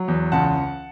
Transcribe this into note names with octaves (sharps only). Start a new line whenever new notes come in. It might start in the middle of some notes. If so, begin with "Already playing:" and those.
Already playing: F#3
E2
C#2 F#5 A5